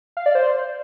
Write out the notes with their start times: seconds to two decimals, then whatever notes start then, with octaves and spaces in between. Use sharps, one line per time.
0.17 F5
0.26 D5
0.35 C5